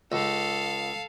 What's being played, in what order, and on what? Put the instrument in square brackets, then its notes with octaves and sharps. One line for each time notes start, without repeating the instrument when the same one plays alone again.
[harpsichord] C#2 [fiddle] A4 F5